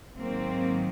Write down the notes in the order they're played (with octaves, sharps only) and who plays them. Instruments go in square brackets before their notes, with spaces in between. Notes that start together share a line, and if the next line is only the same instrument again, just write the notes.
[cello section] G#2 D#3 F#3 A#3 C4